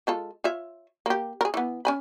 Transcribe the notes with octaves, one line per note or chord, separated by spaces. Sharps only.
G#3 F4 A4
F4 C#5 E5
A#3 G4
G#4 A#4
E3 B3
C#4 G#5 B5